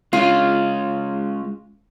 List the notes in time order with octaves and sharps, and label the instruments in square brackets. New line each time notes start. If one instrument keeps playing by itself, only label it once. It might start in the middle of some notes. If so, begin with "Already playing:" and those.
[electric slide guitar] G#3 C#4 [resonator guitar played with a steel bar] F4